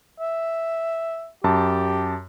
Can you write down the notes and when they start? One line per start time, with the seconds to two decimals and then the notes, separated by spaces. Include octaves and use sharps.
0.20 E5
1.44 F#2 G4 A5